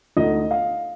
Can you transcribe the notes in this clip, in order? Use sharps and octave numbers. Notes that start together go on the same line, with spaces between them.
D2 D3 A3 D#4 D#5
F5